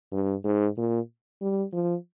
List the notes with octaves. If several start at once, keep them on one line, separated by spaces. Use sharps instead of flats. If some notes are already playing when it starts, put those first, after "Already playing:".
G2
G#2
A#2
G3
F3